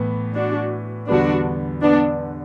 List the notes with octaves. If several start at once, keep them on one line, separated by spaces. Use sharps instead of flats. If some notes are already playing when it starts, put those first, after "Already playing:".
Already playing: A2 E3 B3
D4 F#4
E2 D3 G3 B3 D4 F#4
B3 D4